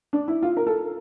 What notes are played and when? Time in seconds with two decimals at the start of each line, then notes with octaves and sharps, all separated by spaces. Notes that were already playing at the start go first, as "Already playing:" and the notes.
0.13 D4
0.28 E4
0.43 F4
0.57 A#4
0.67 A4